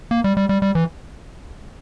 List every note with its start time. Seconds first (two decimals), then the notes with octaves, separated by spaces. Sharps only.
0.11 A#3
0.24 G3
0.37 G3
0.49 G3
0.62 G3
0.75 E3